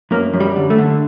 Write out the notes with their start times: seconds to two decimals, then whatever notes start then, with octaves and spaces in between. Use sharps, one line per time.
0.11 F#2 A#3
0.34 F#2
0.40 G3
0.56 D3
0.70 A3
0.78 D3